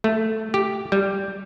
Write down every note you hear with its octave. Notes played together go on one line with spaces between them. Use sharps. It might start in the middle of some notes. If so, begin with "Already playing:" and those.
A3
G4
G3